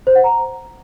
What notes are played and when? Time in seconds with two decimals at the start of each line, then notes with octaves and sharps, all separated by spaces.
0.07 C5
0.15 F#5
0.24 A#5